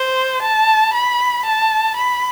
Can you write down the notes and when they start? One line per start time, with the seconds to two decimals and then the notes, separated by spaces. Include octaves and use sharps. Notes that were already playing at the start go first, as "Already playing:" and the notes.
Already playing: C5
0.42 A5
0.93 B5
1.45 A5
1.96 B5